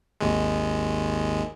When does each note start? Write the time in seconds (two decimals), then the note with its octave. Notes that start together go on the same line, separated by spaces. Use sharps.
0.21 G#1 D#2 G#3